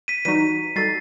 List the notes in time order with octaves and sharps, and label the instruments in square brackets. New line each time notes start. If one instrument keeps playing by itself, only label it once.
[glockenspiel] B6 D#7
[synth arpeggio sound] E3 G3 D#4 F#4 [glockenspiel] B6 D#7
[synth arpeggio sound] G3 D#4 F#4 A4 [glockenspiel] A6 C7